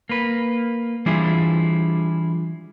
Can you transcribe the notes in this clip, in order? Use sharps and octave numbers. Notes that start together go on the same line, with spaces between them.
A#3 B4
E3 G3 D4 E4 F4 G#4